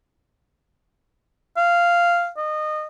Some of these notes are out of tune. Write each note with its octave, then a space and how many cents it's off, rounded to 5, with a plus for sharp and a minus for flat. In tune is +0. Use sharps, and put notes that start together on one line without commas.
F5 -10
D#5 -25